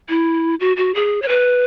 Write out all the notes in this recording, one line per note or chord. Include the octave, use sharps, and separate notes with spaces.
E4
F#4
F#4
G#4
C#5
B4